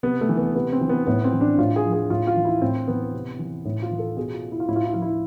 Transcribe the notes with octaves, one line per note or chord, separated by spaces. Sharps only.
C3 B3
A3
E3
B3
C3 B3
C4
E3
B3
A2 B3
C4
E3
D4
A2 F4
G#4
F3
G#4
A2 F4
F4
E3
E4
A2 C4
E3 B3
C3
E3
A2
F4
E3
A4
B2 G#4
F4
E4
F4
A2 E4
F4
E4
F3 F4
E4